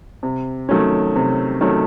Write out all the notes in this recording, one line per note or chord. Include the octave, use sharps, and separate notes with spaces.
C3
D#3 F#3 A3 C#4
C3
D#3 F#3 A3 C#4